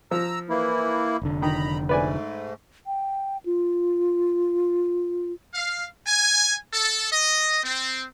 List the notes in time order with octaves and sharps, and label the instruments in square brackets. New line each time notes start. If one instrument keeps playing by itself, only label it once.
[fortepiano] F3 [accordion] A#5 E6
[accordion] E3 A#3 E4
[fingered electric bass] F1 D3
[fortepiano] D#3 [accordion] A#5 B5
[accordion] G#2 A3 [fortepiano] B4 D5 G#5
[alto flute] G5
F4
[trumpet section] F5
G#5
A4
D#5
C4